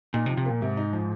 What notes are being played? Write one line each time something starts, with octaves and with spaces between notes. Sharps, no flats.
A#2 D#4
C3
F3
C3
A#2 A#3
G#2 C3
D#4
F3